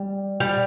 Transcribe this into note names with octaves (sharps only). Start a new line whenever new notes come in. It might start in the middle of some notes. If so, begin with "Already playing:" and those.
Already playing: G3
G3